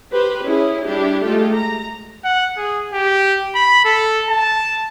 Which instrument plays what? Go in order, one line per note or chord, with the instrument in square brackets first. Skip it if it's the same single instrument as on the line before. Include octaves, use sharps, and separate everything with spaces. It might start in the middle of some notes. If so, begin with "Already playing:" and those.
[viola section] G4 B4 C5
C#4 E4 G#4
G3 D4 E4 G4
G#3 A3 F4 G4 A4
A#5
[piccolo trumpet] F#5
G#4
G4
B5
A4
A5